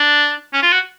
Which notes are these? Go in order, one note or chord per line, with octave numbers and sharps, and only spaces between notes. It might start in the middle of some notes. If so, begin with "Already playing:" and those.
Already playing: D4
C#4
F4
F#4